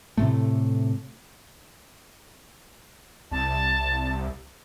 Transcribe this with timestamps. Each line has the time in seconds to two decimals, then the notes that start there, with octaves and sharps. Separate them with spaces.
0.17 A2 C3 A3
3.31 C2 A5